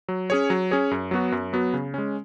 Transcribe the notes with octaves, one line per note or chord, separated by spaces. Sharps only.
F#3
C#4 G#4 C#5
F#3
C#4 G#4 C#5
F#2
F#3 B3 F#4
F#2
F#3 B3 F#4
C#3
G#3 C#4